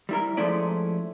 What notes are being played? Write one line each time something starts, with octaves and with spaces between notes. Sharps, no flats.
G3 E4 A#4
F3 G#3 A3 C#4 E4 D5